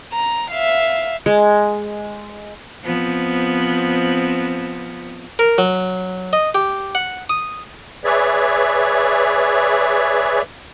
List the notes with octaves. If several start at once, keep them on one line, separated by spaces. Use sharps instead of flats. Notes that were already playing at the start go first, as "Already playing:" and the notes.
A#5
E5 F5
G#3
F3 B3 C4
A#4
F#3
D#5
G4
F#5
D#6
G#4 B4 C#5 D5 E5